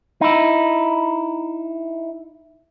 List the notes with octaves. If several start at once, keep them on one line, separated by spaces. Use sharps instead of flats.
D#4 E4